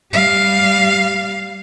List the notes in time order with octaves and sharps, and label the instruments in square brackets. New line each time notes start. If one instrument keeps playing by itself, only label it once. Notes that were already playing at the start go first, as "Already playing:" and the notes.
[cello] G3 F5